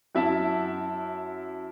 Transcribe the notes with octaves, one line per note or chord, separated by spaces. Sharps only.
F#2 E4 E5 A5